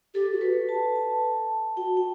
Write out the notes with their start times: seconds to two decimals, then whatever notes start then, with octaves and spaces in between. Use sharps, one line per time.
0.14 G4 A4
0.33 F#4
0.41 B4
0.69 A5
0.96 A5
1.77 F#4 G5
1.97 G5